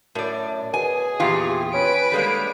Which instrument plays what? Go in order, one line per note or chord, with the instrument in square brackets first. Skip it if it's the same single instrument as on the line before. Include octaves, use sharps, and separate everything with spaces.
[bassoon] F#2 [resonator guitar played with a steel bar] A2 D5
[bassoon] B2 [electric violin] G#4 [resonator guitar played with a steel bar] G#5
[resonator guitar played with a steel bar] E2 A#2 F4 [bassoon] G4
[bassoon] C#4 [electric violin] B4 D7
[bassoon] D3 [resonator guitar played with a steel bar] G3 G#3 A#3